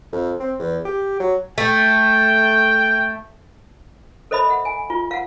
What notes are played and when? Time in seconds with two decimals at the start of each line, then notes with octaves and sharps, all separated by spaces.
0.13 F2
0.40 C4
0.59 E2
0.85 G4
1.20 F#3
1.58 A3 G5
4.31 A4 C5 D#5 E5 B5
4.49 E5 F#5
4.65 G#5
4.90 F4
5.11 F5 F#5